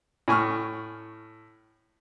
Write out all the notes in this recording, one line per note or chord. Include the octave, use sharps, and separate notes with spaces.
A2 G#5 C#6 F6